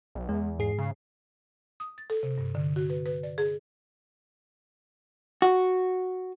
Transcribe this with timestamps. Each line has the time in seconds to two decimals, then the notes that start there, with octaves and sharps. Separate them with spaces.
0.15 B1
0.29 E2 G#3
0.59 G#2 G#4 C7
0.78 C#3
1.80 D#6
1.98 A6
2.10 A4
2.23 C3
2.38 G2
2.55 D3
2.76 F#4
2.90 B4
3.06 B4
3.23 D5
3.38 G#4
5.42 F#4